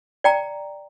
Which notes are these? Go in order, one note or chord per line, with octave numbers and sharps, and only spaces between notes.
D5 G5 A#5